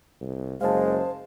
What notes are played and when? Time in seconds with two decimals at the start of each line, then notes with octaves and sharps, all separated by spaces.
0.21 C2
0.61 F#1 G#3 C5 F5 A5